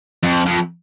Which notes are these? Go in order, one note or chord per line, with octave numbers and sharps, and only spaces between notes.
F2
F2